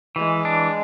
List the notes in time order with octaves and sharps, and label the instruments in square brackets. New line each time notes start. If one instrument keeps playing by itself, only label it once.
[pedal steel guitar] E3 [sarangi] G#3
[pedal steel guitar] D4